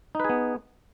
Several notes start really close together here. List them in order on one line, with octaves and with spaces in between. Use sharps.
D#4 B4 G#4 B3